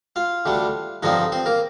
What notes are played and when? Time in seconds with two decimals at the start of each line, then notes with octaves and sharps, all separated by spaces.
0.16 F4 F5
0.46 D2 D3 G3 D4
1.03 G2 D3 F3 C4 D#4 F4 D#5
1.32 C4 C5
1.46 A#3 A#4